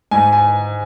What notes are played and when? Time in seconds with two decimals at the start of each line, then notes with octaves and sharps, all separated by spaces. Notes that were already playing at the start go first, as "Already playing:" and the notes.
0.11 G#2 G#5
0.33 G#5